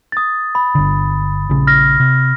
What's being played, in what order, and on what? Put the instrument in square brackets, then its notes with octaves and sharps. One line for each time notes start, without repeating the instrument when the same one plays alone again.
[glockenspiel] D#6 A6
B5
[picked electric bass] G1 D3
A#1 C#3
[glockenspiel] F6 A#6
[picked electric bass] C3